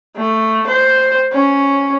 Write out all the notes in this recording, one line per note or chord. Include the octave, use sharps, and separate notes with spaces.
A3
C5
C#4